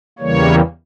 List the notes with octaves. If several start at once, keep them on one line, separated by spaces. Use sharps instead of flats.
E2 C#3 E3 G3 A#3 C#5